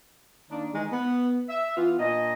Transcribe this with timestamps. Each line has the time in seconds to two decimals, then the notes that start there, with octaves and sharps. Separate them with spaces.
0.51 D#3 A#3 D4
0.73 D#3 E3 G#3
0.91 B3
1.49 E5
1.77 E3 B3 F4
1.99 A#2 D4 D#5